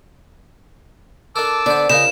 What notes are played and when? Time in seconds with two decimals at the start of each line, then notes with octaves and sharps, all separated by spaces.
1.36 D4 A4 A#4 A5 D6 E6
1.66 D3 B3 C5 D5
1.89 C#3 F4 A#4 C5 D#5 E7